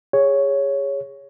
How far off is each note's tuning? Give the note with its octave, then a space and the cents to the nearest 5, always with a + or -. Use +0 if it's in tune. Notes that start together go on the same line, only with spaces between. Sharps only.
G#4 -25 C#5 +0